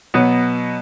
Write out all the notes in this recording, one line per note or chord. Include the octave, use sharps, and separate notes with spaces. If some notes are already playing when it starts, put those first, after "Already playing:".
B2 F#3 B3